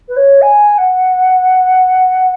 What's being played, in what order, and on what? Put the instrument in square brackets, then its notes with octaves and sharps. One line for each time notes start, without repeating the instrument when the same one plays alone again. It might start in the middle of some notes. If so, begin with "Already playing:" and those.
[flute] B4
C#5
G#5
F#5